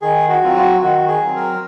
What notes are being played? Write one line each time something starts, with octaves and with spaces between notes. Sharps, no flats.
D#3 G#4
F#4
F#3 C4 F4
F#4
D#3 F#4
G#4
F#3 C4
A#4